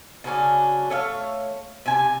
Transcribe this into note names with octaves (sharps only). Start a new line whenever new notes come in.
C#3 F#3 C#4 D4
A3 C#5 D#5 F5
C3 G#5